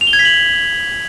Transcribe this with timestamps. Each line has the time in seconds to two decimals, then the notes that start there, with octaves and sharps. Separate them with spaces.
0.01 F7
0.07 G7
0.13 G#6
0.19 B6
0.25 F#7